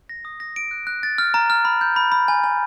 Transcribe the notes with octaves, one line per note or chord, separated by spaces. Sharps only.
A#6
D#6
A#6
D7
F#6
F#6
A6
F6
A#5
F6
B5
G6
B5
B5
G#5
G#5